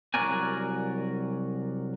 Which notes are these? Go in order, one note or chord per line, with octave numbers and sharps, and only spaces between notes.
C2 F#3 F#4 A#4 D5 G#5